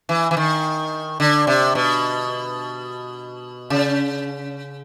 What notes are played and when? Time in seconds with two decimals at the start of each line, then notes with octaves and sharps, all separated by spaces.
0.09 E3
0.31 E3
0.37 D#3
1.20 D3
1.47 C3
1.75 B2
3.70 C#3